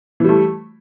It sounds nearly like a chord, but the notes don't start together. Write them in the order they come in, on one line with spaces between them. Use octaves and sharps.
E3 G3 A3